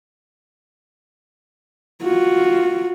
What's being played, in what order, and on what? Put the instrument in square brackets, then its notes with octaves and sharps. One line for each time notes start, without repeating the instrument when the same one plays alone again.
[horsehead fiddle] F4 F#4